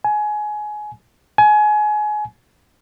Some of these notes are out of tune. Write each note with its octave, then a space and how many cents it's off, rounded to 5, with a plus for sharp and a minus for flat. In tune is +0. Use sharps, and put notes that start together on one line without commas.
G#5 +20
G#5 +25